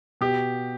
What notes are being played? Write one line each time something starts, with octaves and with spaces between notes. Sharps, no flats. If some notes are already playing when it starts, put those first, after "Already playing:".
B2 G4